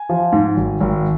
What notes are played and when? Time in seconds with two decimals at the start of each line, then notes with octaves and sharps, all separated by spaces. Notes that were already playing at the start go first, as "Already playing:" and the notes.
Already playing: G#5
0.09 F3
0.32 G#2
0.57 G#1
0.80 G#1